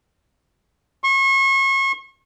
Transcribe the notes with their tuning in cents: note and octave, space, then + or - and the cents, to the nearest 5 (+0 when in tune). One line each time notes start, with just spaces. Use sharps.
C#6 -35